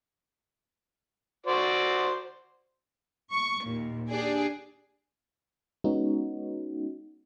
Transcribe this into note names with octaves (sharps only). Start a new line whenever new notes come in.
F#4 C5 D5
C#6
D#2 A#2
D4 G4 G#4 D5
G#3 B3 C#4 D#4 F#4